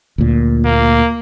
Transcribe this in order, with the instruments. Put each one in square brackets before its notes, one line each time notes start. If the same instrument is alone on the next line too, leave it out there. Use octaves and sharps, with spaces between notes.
[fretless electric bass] D2 A#2
[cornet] A#3